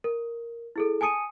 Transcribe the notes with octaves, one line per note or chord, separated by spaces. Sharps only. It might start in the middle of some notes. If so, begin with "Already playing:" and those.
A#4
E4 G#4 A4
G#5 A5 D#6 C#7 D#7